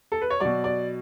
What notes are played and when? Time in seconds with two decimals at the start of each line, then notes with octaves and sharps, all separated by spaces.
0.12 A4
0.22 B4
0.30 C#5
0.40 B2 F#3 D5
0.64 D5